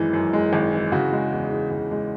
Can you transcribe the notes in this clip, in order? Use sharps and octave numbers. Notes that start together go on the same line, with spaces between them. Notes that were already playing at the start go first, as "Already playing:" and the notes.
Already playing: G#1 F#2 E3 G#3
F#2
G#3
G#1
E3
C#3 F#4
G#3
E2
E3
C#3
G#3